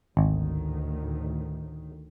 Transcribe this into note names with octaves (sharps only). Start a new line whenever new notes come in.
G#1 D2 A2 D#3